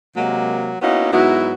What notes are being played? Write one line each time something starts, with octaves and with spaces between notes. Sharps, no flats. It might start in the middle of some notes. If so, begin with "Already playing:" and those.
C3 F#3 G#3 A#3
A#3 B3 C#4 D#4 E4 F#4
G#2 F#3 B3 E4 F#4